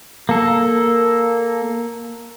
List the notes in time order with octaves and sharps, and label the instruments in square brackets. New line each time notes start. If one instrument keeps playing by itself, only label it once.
[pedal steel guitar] A#3 A4